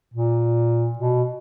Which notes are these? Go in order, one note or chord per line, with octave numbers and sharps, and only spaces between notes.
A#2
B2